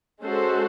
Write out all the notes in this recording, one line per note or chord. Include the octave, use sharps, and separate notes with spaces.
G#3 C#4 F#4 A4 C5